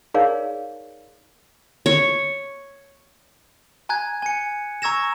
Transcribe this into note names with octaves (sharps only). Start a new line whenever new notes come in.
D#4 G#4 A#4 C#5 D5 F5
C#5
G#5 A#5 F#6 G#6
G#5 C#7
A#5 C#6 E6 G#6 A#6 E7